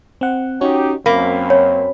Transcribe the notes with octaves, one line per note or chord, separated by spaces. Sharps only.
C4 F#5
C#4 D#4 F#4 G4 C#5
F#2 A#3 C4 B5
C#5